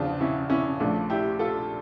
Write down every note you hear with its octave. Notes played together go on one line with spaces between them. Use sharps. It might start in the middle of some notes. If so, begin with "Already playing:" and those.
Already playing: E2 C#3 F3 D4 F4
C#4 E4
C#4 E4
A#1 A#2 A3 D4
E4 G4
F4 A4